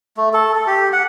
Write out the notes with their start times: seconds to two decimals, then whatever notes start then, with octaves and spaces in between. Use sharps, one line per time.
0.17 A3
0.33 A4
0.55 A4
0.67 G4
0.93 F#5